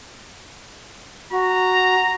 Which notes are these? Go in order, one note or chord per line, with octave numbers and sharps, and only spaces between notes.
F#4 A#5